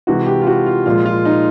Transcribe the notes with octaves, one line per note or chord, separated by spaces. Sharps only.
C3 E3 G#3 F#4
G4
F4
F#4
F4
A#2 F3 G#3 F4
F4
D#4